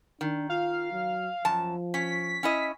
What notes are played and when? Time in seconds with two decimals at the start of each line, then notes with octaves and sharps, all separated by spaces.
0.21 D#3 D4
0.50 F4 F5
0.92 F#3
1.45 F#2 F3 A5
1.94 C#4 B6
2.43 C#4 E4 D#5